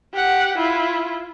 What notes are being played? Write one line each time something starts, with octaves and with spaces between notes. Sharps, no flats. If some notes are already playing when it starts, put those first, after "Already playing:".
G4 F#5
E4 F4